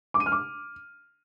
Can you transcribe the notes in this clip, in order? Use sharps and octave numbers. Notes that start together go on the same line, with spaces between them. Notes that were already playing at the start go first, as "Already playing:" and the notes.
D6
D#7
F6
D6